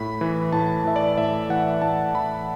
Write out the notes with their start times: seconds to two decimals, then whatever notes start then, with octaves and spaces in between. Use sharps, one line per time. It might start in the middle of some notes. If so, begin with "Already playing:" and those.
Already playing: A2 B5
0.21 E3
0.52 A2 A5
0.84 E3 E5
0.96 D5
1.18 A2 E5
1.49 E3 F#5
1.82 A2 A5
2.15 E3 B5